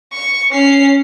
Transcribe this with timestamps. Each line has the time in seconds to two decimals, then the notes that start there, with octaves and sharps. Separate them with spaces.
0.13 C#6
0.51 C#4 C7